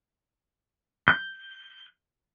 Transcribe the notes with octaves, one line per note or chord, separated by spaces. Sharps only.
G6